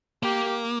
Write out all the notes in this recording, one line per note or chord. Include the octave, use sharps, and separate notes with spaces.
A#3 G4